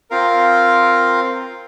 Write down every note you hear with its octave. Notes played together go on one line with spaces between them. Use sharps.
C4 F4 A#4 F5